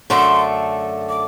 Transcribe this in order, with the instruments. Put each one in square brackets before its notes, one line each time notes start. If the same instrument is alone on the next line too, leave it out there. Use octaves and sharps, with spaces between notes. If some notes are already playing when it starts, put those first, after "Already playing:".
[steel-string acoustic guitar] F#2 D3 A3 [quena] C6
[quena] D6